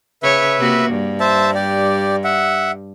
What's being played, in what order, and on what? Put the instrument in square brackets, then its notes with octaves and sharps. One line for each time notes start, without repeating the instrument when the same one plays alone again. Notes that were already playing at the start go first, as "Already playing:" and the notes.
[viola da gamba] C#3 C#5 [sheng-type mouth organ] B4 E5
[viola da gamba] C3 A#3 F#4
G2
[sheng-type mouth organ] C5 E5 A5
G4 D5
E5 F#5